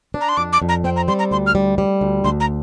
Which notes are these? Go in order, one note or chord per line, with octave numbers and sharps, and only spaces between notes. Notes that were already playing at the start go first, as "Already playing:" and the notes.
D4
A#5
C6
F2 D6
D6
F2
A#5
C4 G5
A#5
G3 C6
A#5
D2 C6
F6
G3
G3
D2
D2 C6
A#5